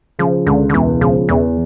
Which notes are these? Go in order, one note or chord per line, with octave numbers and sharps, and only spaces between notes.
C#3 F3
C#2 D3
D3
E1 E3
C#3 F3
E2 E3